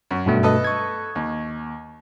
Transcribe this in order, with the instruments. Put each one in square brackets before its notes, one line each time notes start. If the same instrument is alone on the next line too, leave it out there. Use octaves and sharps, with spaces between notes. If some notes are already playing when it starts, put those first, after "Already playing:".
[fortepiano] F#2
[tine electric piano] G2 B2 A3
[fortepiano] A4 B4 D#5
[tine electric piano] C#6 G#6
[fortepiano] D#2